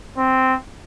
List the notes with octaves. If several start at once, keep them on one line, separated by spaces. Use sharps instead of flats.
C4